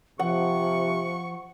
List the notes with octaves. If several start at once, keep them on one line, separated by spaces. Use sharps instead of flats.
C3 F3 F#5 C#6